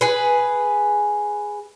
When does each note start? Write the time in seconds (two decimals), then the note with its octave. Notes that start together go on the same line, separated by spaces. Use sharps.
0.01 G#4 B4